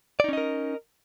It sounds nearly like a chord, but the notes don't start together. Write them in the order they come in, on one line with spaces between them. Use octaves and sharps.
D5 D#4 C#4 D#5 A#4